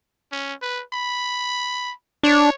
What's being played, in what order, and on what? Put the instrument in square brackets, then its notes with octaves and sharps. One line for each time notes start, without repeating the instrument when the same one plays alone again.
[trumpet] C#4
B4
B5
[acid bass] D4 [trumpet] C#5